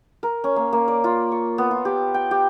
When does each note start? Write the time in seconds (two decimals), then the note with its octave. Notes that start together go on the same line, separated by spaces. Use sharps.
0.23 A#4
0.44 C#4
0.56 A#3
0.73 A#3
0.88 D5
1.04 F4
1.32 C#6
1.58 B3
1.71 F4
1.85 G4
2.14 G5
2.31 G4